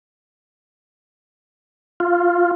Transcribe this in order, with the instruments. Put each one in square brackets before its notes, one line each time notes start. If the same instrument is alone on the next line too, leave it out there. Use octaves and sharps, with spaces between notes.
[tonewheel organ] F4